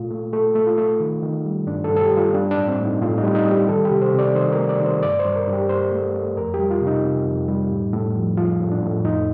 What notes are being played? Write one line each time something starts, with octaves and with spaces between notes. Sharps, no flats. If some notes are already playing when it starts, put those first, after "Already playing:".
Already playing: A#2 A3 F4
A3
A3 A4
A3
F4
A3
D#3
D#3
G3
G2 D4
A4
G2
A4
G4
G3
F4
G3 D4
D4
A2
C4
A2
D#4
A2 F4
D#4
G3
D#4
G3
G4
D#3 A4
G4
C3
C5
C3 D5
D#3 C5
A#4
A3
D5
D#3
C5
G2 D5
C5
G2
A#4
G2
G4
G2 C5
A3
A3
F2 A#4
G4
G3
F4
C3
D#4
C3
F2
G3
A2
A2
F3
F3 F4
A2
D4
A2
F2 D#4